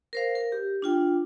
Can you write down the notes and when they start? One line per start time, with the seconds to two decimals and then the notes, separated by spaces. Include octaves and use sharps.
0.13 A#4 C5 F5
0.35 A#4
0.52 G4
0.82 D4 F4 G5